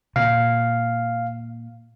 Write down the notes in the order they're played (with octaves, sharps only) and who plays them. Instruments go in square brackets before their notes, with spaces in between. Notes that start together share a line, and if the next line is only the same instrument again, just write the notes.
[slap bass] A#2 [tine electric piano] F5